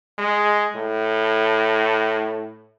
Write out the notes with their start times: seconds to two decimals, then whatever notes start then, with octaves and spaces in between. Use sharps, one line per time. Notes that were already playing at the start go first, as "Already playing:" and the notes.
0.18 G#3
0.75 A2